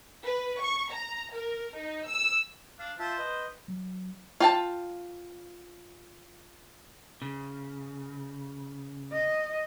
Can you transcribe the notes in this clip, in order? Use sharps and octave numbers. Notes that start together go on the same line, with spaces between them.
B4
C#6
A#5
A#4
D#4
E6
D4 F5
F4 C5 E5 A5
B4 D#5
F#3
F4 G5 A5
C#3
D#5